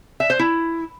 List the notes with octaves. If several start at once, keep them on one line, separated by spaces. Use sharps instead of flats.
E5
C5
E4